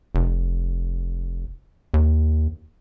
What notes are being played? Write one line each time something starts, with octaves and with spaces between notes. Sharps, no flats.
F1
D#2